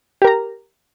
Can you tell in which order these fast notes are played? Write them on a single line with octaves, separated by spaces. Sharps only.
G4 A#4 A#5